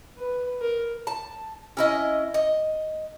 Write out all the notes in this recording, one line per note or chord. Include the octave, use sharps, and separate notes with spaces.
B4
A#4
A5
C#4 E4 D#5
D#5